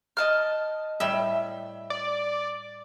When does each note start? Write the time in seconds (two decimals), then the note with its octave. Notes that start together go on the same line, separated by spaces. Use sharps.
0.17 D#5 A5 F6
1.00 A2 G3 E5
1.90 D5